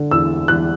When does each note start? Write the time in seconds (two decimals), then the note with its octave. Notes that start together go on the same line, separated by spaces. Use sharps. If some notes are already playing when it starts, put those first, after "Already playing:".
Already playing: D3
0.11 E2 E6
0.48 E2 F#6